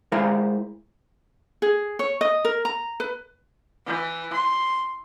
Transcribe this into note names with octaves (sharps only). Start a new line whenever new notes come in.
G#3 E4 A#4 C5 F5
G#4
C#5
D#5
A#4
A#5
B4
E3
C6